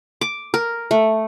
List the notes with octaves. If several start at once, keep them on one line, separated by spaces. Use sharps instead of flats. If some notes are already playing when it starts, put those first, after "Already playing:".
D6
A#4
A3